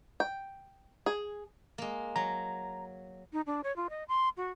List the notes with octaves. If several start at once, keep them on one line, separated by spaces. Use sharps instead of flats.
G5
G#4
G#3 A#3
F#3 A#5
D#4
D4
C#5
F4
D#5
C6
F#4